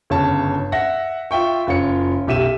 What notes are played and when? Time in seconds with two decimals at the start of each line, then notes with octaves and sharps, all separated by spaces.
0.10 G1 C#3 C#5 A5
0.72 E5 F#5 A#6
1.31 F4 E5 G5 C#6
1.67 F#1 F4 C#5 C#7
2.27 B1 G4 E5 D#7 E7